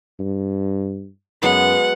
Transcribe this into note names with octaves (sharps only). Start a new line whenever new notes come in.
G2
F#2 F#3 G#3 B3 F#5